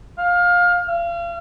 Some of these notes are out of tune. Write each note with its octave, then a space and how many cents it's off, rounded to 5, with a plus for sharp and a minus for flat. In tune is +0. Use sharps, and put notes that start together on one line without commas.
F5 +20
F5 -35